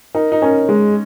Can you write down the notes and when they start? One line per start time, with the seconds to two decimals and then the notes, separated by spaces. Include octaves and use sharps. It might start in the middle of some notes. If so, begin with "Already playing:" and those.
0.15 D#4 A#4
0.32 D#4
0.42 C#4 A#4
0.69 G#3